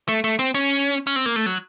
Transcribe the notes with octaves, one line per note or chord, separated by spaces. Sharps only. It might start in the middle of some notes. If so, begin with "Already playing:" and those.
A3
A3
C4
C#4
C#4
C4
A#3
A3
F#3